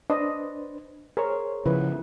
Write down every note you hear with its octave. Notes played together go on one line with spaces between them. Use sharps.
D4 B4 C5 D#5
G#4 A#4 C5 C#5
C#3 F3 E4 B4